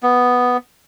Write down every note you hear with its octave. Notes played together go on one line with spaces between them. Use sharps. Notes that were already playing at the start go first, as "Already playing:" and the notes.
B3